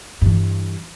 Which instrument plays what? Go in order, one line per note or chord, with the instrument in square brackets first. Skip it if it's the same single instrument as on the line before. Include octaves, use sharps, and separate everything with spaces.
[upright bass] G2 E3